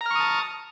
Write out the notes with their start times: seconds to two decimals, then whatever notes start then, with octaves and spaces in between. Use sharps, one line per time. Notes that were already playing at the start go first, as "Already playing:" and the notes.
0.01 A#5
0.06 F6
0.11 C#6
0.15 D#6
0.20 A5